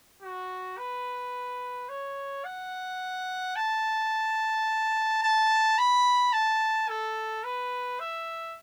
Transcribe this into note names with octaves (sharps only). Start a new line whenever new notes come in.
F#4
B4
C#5
F#5
A5
A5
B5
A5
A4
B4
E5